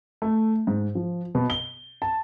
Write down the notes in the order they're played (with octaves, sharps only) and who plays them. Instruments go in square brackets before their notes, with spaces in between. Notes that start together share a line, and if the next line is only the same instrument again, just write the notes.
[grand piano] A3
G#2
F3
B2
G7
A5